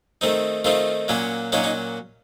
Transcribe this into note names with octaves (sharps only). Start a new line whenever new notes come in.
D#3 A3 C4 D#4
D#3 A3 C4 D#4 F4
A#2 F#3 A#3 C#4
A#2 F#3 A#3 C#4 D#4
D#4